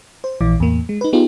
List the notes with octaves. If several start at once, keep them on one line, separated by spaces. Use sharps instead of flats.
C5
A#1 E3 D6
E2 A2 A#3
G#3
D#4 B4
B3 D#4 F4 G4 G#4